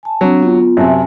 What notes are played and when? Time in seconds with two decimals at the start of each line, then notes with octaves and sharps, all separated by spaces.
0.03 G#5 A5
0.21 F#3 C4 D4
0.40 B3 F4
0.77 F#2 C3 E5 G#5 A5